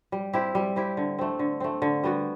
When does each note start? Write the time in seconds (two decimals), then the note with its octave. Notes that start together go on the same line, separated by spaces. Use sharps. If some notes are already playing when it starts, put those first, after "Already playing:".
0.12 G3
0.33 C4 E4 G4
0.55 G3
0.76 C4 E4 G4
0.97 D3
1.18 A3 C4
1.39 D3
1.60 A3 C4
1.82 D3
2.04 G3 B3 F#4